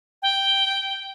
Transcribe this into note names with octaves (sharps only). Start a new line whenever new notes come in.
G5